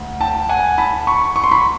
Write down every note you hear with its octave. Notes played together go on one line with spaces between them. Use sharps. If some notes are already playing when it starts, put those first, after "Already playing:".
Already playing: D2
G5 A5
F#5 G#5
A5 B5
B5 C#6
C#6
C6
B5 C#6